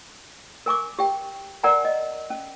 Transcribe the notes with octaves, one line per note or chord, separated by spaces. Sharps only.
A#4 G#5 C#6 D6
G4 G5
A#4 D5 F#5 G#5 A#5
D#5
C#4